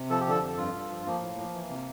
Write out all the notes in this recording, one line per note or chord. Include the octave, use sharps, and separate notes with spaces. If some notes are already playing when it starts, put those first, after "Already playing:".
Already playing: C3
F3 A4
G4
D3 A4
F2
G2 F4
G2
F3
F3 A#3
A2
F3
E3
C3